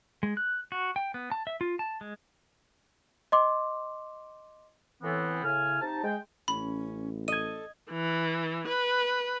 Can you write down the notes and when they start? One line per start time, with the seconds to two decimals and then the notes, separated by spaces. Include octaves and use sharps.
0.23 G#3
0.37 F#6
0.72 F#4
0.96 G5
1.14 B3
1.32 A5
1.47 E5
1.61 F4
1.79 A5
2.01 G#3
3.32 D#5 C6 D6
5.03 A2 E3 B3 C4
5.44 A2 C#3 G#5 F6
5.82 C3 D#4 A5
6.04 G#3 G5
6.48 A1 C#4 B5
7.28 A4 D#5 G#6 D#7
7.91 E3
8.67 B4